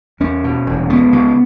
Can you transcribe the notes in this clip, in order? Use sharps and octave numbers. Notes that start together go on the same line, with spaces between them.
E2 C#4
B2
E1
C#2 B3
C#2